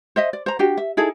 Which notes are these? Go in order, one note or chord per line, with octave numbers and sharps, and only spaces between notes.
C5 D#5 E5
D5
C5 A#5
D4 F#4 G4 G5
E5
D#4 E4 G#4 A4